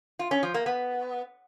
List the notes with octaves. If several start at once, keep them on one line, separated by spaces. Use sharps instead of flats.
F4
C#4
F3
A#3
B3